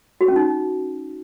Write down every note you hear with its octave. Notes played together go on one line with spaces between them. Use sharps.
F#4
C#4
D#4